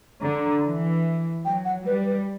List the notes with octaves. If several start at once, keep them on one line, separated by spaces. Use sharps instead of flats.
D3 A#5
E3
F#3 G5
F#5
G3 B4
B4